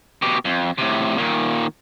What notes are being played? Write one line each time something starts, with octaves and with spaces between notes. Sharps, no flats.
B2 G4
F2
A2 C3
A#2 D#3